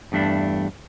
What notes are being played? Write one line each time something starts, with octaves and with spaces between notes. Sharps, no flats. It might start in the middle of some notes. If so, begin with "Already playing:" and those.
E2 G2 A3 D4